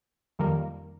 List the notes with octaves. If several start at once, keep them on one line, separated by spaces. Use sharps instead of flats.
F2 D#3 G3 A#3